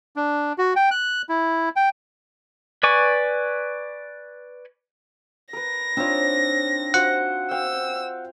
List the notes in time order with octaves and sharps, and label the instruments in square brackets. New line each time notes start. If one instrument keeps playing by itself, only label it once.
[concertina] D4
F#4
G5
F#6
E4
G5
[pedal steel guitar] B4 D5 G#5 C#6
[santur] A#4 B4 [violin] A#6
[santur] C4 F4 [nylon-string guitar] D4 D#4 C#5
[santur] F4 F#4 C5 [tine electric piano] F#5
[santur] F5 G5 [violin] E6